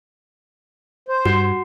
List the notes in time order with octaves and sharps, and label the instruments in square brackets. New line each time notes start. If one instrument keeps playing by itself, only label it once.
[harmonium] C5
[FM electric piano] G2 [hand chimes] F#4